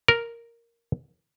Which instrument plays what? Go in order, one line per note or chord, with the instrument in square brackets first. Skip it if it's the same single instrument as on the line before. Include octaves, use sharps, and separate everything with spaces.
[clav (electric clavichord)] A#4